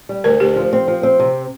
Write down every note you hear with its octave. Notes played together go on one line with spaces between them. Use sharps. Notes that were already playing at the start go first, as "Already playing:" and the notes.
G3
D2 A#4
D2 G4
F3
C4
F3
C4
C3